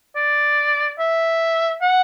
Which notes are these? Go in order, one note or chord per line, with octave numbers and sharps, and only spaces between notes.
D5
E5
F#5